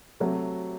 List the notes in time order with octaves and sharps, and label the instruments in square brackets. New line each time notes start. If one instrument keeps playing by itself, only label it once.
[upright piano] C3 F#3 A3